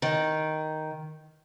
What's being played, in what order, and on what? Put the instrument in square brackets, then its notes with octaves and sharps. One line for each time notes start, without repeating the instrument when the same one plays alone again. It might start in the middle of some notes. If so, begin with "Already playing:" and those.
[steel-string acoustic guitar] D#3